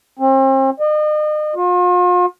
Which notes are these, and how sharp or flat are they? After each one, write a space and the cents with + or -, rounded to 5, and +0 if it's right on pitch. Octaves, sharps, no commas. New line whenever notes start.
C4 +40
D#5 -40
F4 +40